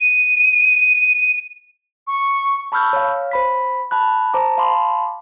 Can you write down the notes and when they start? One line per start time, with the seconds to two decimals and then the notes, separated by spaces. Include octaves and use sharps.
0.01 D#7
2.07 C#6
2.72 A5 B5 C#6 E6 F6 G6
2.93 C#5 F5
3.31 C5 B5 B6
3.91 A5 B5 F#6
4.33 C5 A5 A#5 D6
4.58 F5 A5 B5 C6 D6